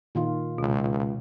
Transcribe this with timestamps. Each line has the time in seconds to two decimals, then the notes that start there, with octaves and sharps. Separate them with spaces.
0.15 A#2 D#3 F4
0.58 C#2 B2